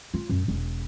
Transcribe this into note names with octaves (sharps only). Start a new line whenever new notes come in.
F4
F#2
E1